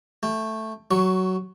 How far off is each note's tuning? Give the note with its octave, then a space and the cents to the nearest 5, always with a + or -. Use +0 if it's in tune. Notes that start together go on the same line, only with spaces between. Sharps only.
A3 +0 G5 +20
F#3 +15 C#6 +0